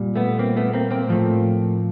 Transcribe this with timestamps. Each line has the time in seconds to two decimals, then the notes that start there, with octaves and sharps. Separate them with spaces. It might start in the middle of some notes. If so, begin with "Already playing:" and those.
Already playing: A#2 G3
0.16 A3 B3
0.39 A#3 C4
0.57 A3 B3
0.73 A#3 C4
0.91 A#3 C4
1.08 A2 F3 A3